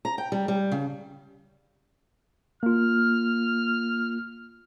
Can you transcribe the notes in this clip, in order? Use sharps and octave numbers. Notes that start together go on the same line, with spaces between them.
A#5
G5
G3
G3
C#3
A#3 F4 F6